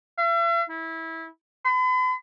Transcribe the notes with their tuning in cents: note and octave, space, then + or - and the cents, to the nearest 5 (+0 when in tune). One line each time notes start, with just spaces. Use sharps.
E5 +45
E4 -20
B5 +45